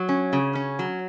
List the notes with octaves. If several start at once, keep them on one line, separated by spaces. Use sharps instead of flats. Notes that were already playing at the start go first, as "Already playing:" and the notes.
Already playing: F#3
C#4
C#3
C#4
F#3